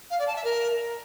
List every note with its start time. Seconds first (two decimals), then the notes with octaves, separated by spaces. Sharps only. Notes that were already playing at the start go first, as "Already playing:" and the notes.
0.10 F5
0.19 D5
0.27 A5
0.35 E5
0.44 A#4